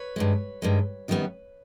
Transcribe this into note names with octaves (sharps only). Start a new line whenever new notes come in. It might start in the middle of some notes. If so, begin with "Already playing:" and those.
Already playing: B4 C#5
G2 D#3 G#3
G2 D#3 G#3
F#2 D#3 G3 B3